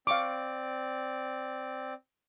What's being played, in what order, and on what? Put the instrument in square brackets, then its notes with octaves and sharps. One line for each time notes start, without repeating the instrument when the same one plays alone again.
[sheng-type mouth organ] C4 D5 [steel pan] F5 C#6 D6